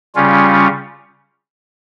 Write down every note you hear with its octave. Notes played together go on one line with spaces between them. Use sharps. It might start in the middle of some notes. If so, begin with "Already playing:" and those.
C#3 G3 C#4 F4